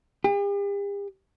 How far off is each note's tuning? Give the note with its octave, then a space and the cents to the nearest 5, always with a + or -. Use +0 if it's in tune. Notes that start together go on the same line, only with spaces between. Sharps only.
G4 +45